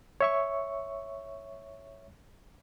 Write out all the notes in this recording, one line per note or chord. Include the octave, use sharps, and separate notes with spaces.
C#5 E5 C#6